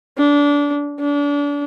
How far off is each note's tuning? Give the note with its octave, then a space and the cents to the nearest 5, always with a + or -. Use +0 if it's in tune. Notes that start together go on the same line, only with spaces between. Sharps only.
D4 -25
D4 -35